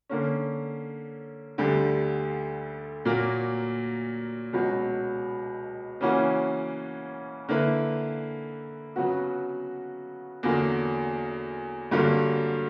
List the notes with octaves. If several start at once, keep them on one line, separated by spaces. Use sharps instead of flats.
D3 A#3 C#4
D2 D3 G3
A#2 F#3 A#3
C#2 B2 F#3
C#3 E3 A#3 C#4 F#4
D3 A#3 E4 B4
C#3 F#3 B3 F#4
E2 D3 F#3 A#3
G2 D3 F#3 A#3